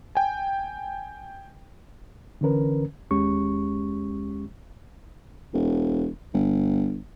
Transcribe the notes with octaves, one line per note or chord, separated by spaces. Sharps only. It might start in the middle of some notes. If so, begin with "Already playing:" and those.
G5 G#5
D3 E3 C#4 A#4 B4
D#2 G#3 C#4 G4 C#6
E1
G1